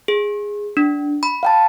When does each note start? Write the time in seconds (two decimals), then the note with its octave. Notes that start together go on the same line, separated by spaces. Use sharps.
0.08 G#4
0.77 D4
1.23 B5
1.43 F5 G5 A5